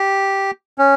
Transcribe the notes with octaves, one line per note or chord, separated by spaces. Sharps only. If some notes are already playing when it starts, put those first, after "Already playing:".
Already playing: G4
C#4